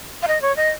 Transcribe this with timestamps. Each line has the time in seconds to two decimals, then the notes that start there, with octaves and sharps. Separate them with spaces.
0.23 F5
0.28 D#5
0.42 C#5
0.57 D#5